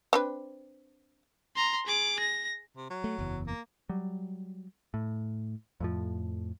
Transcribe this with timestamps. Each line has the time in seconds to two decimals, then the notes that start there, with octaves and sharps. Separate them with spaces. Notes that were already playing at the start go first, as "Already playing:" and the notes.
0.13 C4 D4 B4
1.56 A#5 C6
1.87 G#4 D6
2.20 A#6
2.76 C3
2.90 F#3
3.04 A3
3.19 F#1 E2
3.47 A#3
3.89 F#3 G3
4.94 A2
5.80 F2 A2 F3